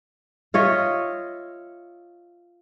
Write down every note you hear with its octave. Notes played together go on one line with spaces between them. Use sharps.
F4 C#5 D#5 E5